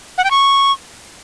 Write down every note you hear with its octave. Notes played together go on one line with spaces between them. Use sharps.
F#5
G5
C#6